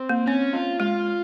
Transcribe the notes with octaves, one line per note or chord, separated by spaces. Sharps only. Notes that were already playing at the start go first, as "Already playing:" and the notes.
Already playing: C4
A#3
C4 C#4
F4
G#3 F4